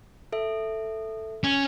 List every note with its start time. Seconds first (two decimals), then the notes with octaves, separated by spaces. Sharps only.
0.32 A4 E5
1.44 C#4